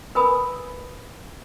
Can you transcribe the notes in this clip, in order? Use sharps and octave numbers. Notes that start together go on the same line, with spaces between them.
A#4 B4 G#5 B5 D#6